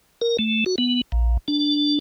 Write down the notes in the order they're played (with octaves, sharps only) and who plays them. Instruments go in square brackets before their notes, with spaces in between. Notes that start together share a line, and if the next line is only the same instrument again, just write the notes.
[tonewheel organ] A#4
A3
F#4
B3
A#1
D4